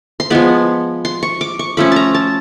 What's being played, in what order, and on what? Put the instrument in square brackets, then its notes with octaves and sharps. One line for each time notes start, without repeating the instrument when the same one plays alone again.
[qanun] C6
F3 G#3 B3 B5
C6
C#6
D6
C#6
F3 A3 C#4 B5
A5 A#5
A5